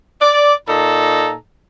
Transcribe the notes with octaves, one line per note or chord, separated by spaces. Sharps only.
D5
A#2 D#4 A4 A#5